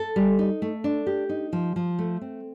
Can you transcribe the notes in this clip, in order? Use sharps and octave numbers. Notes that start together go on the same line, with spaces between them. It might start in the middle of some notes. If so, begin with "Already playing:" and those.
Already playing: A4
G3
D#4
A3
D4
G4
D#4
F3
F3
A3
C4